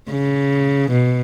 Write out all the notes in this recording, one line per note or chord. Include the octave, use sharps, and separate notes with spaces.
C#3
B2